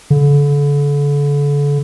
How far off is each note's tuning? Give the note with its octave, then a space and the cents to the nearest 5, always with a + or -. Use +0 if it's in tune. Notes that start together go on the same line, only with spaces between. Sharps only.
D3 -35